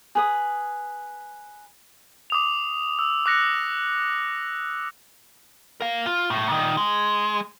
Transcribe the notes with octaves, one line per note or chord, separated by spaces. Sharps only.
G#4 B4 D#6
D6 D#6 F7
E6
D6 F#6 A#6 C#7
A#4 F5
F4
B1 A2
A#2 D#3
G#3